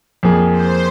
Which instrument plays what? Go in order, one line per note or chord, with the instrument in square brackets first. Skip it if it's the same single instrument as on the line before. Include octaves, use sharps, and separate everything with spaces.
[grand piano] F2 F3 A#3 G#4
[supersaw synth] C5